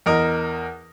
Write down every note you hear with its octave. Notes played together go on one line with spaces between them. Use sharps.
E2 A#4 D#5